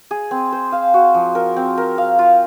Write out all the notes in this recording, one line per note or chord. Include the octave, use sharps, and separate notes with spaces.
G#4
C4
C5
F5
F#4
F3
A#4
C4
A#4
F5
F4